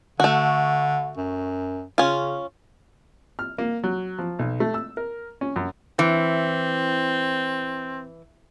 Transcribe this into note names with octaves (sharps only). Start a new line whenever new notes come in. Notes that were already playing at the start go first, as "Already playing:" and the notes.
D3 A3 F#4
F#2
C#3 C#4 F4
F6
A#3
F#3
F3
B1
A3
E6
A#4
C#4
F#2
E3 C4